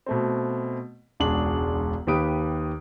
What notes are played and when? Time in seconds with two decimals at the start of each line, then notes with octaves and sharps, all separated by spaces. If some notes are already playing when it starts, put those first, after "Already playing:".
0.06 B2 A3 C4
1.20 E1 C#2 D4 F#4 G#4 F#7
2.07 D#2 D#3 G4 B4 D#6 D7